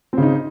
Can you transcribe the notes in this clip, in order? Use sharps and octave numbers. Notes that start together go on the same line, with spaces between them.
C#3 C4 D#4